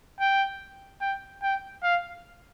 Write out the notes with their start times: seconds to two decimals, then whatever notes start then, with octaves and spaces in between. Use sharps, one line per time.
0.20 G5
1.01 G5
1.42 G5
1.83 F5